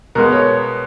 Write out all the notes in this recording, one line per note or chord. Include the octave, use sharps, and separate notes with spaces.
B2 G#3 B3 A#4
C#5